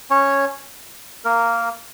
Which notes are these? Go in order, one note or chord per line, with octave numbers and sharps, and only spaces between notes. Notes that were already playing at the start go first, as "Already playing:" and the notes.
C#4 C#5
A#3 A#4